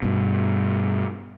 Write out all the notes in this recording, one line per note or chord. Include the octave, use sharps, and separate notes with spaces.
G2 B2